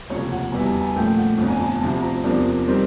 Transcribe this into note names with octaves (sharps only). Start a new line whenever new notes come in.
F1 D#2 C#3 F3 C#5
F#5
E2 B2 G3 B3 E4 G#5
A5
G#5
A#2 F3 A3 C#4 G5
F#5
G1 F2 D3
G#5
A5
D2 C3 F3 A5
A#5
E2 C3 F3 A#3 D4
D#3 G3 C4